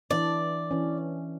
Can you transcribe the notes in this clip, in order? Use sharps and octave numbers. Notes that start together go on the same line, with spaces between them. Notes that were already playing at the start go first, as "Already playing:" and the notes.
E3 D4 D5
E3 C#4